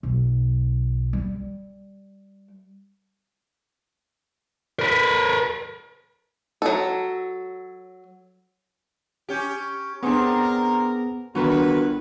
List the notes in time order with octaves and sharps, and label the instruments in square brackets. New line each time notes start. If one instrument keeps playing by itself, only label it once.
[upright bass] B1
G3
[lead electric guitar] A#4 B4
[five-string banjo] F#3 A4
[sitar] C#4 G4
[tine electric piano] B3 G#4 [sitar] C4 D4 [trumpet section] A#4 A#5
[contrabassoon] G1 [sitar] D#2 D3 [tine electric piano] F#4 A#4 [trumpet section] B4